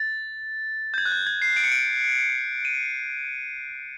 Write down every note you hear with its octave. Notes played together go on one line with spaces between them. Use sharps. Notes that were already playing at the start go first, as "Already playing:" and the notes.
Already playing: A6
G6
G#6
F#6
G6
G#6
C7
D7
C#7
D7
D#7